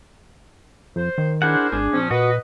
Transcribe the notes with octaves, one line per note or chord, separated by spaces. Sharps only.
F2 C5
D#3
D4 E4 G#4 A#4 C5 F#5
G#1 D4 G#4
A#2 F3 C4 C#4
A#2 F#4 B4 D#5